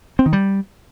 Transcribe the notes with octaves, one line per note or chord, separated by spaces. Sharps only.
C4
D#3
G3